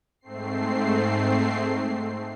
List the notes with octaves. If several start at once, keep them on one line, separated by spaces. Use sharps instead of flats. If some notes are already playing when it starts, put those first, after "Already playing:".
G#2 A3 C4 C7